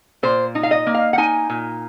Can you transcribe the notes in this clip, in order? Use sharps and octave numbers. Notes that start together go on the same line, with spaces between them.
A#2 C5
D#4
F5
D#5
A#3
F5
F#5
D#4 G#5
A#2